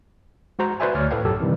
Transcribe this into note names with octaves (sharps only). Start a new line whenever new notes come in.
G#3 F#4 C5 A#5
F#4 B4 C5 D5 E5 G#5
D2 C#5 D5 F6
A2 A4 B4 C#5 F5 G5
B1 F#2 C#4 G4 A4
C3 D#3 E3 G3